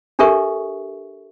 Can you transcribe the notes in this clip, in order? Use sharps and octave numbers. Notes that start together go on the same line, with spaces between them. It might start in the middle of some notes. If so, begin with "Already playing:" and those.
D4 G4 A4 A#4 E5 C#6